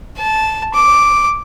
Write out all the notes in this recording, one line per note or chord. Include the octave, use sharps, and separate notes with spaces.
A5
D6